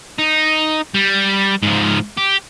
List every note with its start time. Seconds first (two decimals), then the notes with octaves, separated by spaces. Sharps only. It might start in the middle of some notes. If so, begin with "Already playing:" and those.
0.19 D#4
0.94 G3
1.62 G#2 F3
2.17 G4